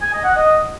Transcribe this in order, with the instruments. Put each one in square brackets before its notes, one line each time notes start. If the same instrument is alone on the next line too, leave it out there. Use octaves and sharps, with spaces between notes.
[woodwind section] G#5
D#5
F#5
D#5